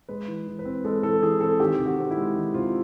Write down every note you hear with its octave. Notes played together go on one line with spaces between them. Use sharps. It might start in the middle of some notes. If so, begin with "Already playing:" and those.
G#3 B4
E3
E3
B4
C4
G#3 A4
E3 A4
E3 G#4
C4 A4
D#3 G4
C3
F#4
C4
E4
G#3
D#3
C3 F4